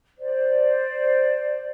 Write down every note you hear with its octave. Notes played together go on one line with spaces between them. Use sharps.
C5 D5